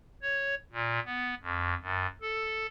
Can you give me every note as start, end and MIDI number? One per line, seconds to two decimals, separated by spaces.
0.22 0.55 73
0.72 0.99 46
1.05 1.34 59
1.43 1.75 41
1.81 2.07 42
2.21 2.66 69